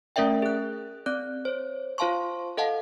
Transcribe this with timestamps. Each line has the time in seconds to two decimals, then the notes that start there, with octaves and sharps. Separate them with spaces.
0.16 A3 C#4 A#4 D5 E5 G5
0.42 G#4 F#6
1.06 C4 D5 F#6
1.45 C5 C#5
1.98 F4 C5 F5 A5 C6 C#6
2.57 A4 D#5 F5 F#5 A5